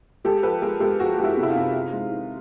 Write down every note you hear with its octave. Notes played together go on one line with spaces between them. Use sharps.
G#3 G4 A4
F3 A4 B4
G#3 G#4 A#4
G#3 G4 A4
F3 F#4 G#4
G#3 G4
E4 F#4
C3
E4
D#4 F4
C3
D#3
G#3
D#3